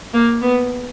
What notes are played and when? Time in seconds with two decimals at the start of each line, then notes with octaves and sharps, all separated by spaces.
0.14 A#3
0.41 B3